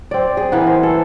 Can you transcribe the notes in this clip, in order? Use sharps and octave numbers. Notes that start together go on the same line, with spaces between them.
C4 D5
G#4
E3 A#3 B3
C5
A4